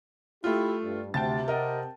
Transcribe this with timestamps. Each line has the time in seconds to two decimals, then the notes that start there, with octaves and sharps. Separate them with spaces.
0.44 A3 E4 F4 G4
0.82 G2
1.14 D2 C3 G5 A5 A6
1.48 A#4 D#5 F#5